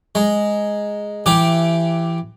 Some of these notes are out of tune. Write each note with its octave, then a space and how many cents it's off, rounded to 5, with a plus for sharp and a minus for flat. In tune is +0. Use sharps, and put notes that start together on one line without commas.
G#3 +0 A#5 +0
E3 +20 G4 +0 D6 +0